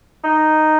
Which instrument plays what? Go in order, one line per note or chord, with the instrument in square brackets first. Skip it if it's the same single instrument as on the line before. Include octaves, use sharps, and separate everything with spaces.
[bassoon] D#4